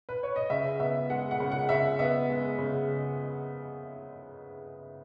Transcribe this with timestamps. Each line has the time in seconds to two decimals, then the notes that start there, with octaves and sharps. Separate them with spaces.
0.09 B4
0.23 C#5
0.36 D#5
0.50 C#3 E5
0.80 B3 E5
1.10 G#3 F#5
1.31 F#5
1.40 C#3
1.52 F#5
1.69 C#3 E5
1.99 B3 E5
2.29 G#3
2.59 C#3